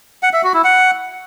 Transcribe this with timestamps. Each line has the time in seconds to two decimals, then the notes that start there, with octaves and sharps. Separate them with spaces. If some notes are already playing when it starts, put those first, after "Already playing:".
0.23 F#5
0.33 E5
0.44 F#4
0.54 E4
0.64 F#5